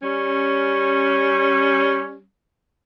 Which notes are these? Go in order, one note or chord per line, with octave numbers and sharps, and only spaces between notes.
G3 C#4